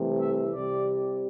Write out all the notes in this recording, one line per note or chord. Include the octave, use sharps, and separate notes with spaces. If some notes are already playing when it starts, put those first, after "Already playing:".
Already playing: C2 C3 E3 A3
E5
C2 C3 G3 D5